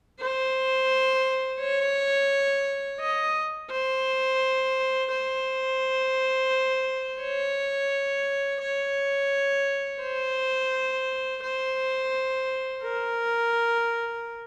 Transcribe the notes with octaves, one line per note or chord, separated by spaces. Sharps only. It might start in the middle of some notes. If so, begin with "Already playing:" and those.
C5
C#5
D#5
C5
C5
C#5
C#5
C5
C5
A#4